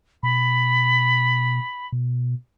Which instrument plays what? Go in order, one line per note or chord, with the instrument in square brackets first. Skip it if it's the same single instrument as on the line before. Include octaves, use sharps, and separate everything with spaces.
[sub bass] B2 [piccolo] B5
[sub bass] B2